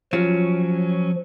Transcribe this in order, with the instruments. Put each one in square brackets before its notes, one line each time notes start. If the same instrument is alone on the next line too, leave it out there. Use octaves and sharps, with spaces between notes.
[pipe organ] F3 [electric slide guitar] F#3 C#4 [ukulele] F4